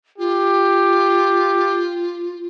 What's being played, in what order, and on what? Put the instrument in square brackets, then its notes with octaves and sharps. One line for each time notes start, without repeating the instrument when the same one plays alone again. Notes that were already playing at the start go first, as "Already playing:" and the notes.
[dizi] F4 [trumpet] G4